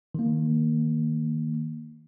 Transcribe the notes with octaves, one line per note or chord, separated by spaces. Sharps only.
D#3 A#3